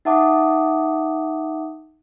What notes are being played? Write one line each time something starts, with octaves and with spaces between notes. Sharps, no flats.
D#4 E5 F#5 A5 D6 D#6